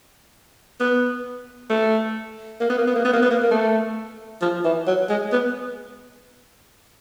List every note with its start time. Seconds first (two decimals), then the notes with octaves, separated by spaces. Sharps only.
0.80 B3
1.70 A3
2.60 A#3
2.70 B3
2.78 A#3
2.87 B3
2.95 A#3
3.05 B3
3.13 A#3
3.22 B3
3.31 A#3
3.42 A#3
3.51 A3
4.41 F3
4.64 E3
4.87 F#3
5.09 G#3
5.32 B3